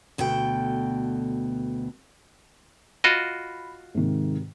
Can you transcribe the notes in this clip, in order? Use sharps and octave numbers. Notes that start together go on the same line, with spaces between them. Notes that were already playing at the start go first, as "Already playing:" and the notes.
D2 B2 A4 G5
F4 F#4 D#5 B5
G#2 C3 D#3